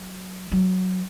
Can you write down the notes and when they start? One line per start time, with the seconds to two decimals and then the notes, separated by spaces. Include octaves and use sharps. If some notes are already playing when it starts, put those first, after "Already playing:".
Already playing: F#3
0.52 F#3